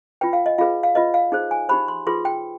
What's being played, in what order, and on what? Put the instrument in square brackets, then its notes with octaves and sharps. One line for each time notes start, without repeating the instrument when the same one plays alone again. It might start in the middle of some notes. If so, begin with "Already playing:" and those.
[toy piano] F4 B4 G5
F5
D#5
F4 G#4 B4 F5
F5
F4 B4 D#5
F5
D#4 G#4 C5
G#5
D#4 G4 C5 B5
C6
F4 G#4 B4 C6
G5